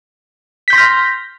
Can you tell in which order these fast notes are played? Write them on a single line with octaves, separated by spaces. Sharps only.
B6 G6 C6 A#6 F6